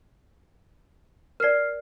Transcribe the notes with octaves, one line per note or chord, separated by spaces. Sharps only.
A#4 D5 F6 C7